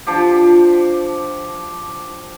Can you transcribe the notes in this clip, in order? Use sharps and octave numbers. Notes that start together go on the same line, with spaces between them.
F3 D4 G4